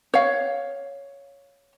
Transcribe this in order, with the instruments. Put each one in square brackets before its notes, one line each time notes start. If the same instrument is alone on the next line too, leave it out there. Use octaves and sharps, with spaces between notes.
[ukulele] C#5 F5